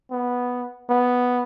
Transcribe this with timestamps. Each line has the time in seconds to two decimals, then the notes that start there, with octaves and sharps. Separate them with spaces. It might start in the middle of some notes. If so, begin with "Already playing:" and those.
0.11 B3
0.89 B3